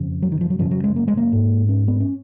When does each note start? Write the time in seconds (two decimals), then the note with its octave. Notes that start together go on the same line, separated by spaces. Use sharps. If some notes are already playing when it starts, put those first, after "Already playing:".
Already playing: F2 C#3
0.22 F#3
0.32 D#3
0.41 F3
0.50 F#3
0.59 F#2 C#3 F3
0.71 F#3
0.84 G#3
0.96 A#3
1.08 G#3
1.17 A#3
1.32 G#2
1.69 C#4
1.88 B3
2.00 C#4